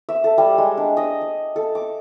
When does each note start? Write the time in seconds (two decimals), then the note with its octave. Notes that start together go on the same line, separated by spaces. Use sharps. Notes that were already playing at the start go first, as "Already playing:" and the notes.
0.09 E5
0.24 A4
0.38 G3
0.58 G#3
0.77 D4
0.97 D#5
1.21 D5
1.56 A4
1.75 D6